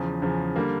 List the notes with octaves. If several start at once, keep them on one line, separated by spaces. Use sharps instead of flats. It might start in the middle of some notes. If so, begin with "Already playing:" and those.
Already playing: E2 C#3 F3
E2 C#3 F3
D3 G3 A#3